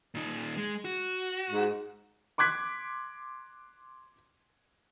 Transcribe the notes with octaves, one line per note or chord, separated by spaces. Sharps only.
A#2 D#4
G#3
F#4
G#2
C6 D6 F#6 G#6 B6